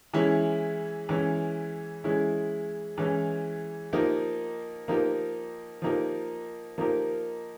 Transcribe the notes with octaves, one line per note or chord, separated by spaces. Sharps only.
E3 G#3 C#4 E4
E3 G#3 C#4 E4
E3 G#3 C#4 E4
E3 G#3 C#4 E4
F3 A#3 D#4 G4 A#4
F3 A#3 D#4 G4 A#4
F3 A#3 D#4 G4 A#4
F3 A#3 D#4 G4 A#4